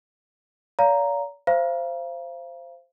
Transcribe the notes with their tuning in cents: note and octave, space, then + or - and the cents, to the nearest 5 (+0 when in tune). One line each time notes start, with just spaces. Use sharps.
D5 -45 F5 +5 A#5 +0
C5 +0 F5 -35 A#5 +35